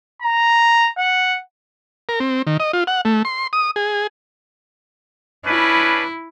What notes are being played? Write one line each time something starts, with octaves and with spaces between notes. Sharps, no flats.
A#5
F#5
A#4
C4
D#3
D#5
F4
F#5
A3
C6
D#6
G#4
C#4 D4 E4 B4